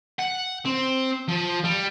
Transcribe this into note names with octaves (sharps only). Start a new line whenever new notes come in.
F#5
C4
F3
G3